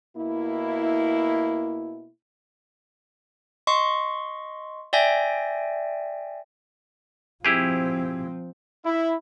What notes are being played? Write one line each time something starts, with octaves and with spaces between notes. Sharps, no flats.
B2 A#3 E4
D#5 C6 C#6
D5 E5 G5 G#5 A#6
F3 C4 E4 G4 G#4
E4